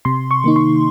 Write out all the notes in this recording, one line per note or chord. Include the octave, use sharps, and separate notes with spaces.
C3 C6
C#6
D#3 A#3 D#4
C6